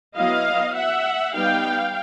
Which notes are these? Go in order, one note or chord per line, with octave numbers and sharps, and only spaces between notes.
F#3 B3 E4 D#5 F5
E5 F#5
G3 B3 D#4 F5 G5